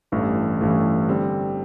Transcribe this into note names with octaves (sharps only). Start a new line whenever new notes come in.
A1 G2 E3 A3
A1 G2 E3 A3
D3 G3 C4